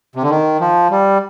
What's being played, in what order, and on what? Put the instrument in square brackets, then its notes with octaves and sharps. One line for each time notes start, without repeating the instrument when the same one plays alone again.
[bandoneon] C3
D3
D#3
F3
G3